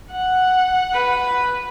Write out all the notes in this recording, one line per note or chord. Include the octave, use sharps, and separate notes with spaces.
F#5
B4